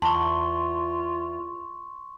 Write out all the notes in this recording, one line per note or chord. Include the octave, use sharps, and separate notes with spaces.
E2 F4 A5 C6 C#6